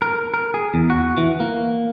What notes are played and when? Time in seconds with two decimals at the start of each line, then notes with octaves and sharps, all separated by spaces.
0.02 A#4
0.34 A#4
0.54 G#4
0.74 E2
0.90 F#4
1.17 E3
1.40 A#3